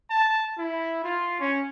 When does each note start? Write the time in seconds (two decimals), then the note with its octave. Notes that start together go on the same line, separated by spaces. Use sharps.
0.10 A5
0.58 E4
1.04 F4
1.40 C#4